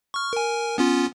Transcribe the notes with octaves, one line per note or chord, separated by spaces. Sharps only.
C#6 F6
A#4 G#5
B3 C#4 F4